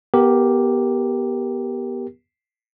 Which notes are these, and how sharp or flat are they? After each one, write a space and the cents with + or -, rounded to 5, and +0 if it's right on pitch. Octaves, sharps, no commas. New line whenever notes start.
B3 -20 G4 +0 A#4 +0